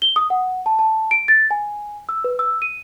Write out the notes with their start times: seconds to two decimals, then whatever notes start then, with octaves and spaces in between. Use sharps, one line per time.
0.02 G7
0.16 D#6
0.30 F#5
0.66 A5
0.79 A5
1.11 D7
1.28 A6
1.51 G#5
2.09 E6
2.24 B4
2.39 E6
2.62 D#7